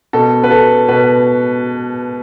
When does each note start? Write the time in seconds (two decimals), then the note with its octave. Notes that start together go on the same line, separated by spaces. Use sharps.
0.13 B2 A4
0.44 B4
0.51 A4
0.88 B2 B4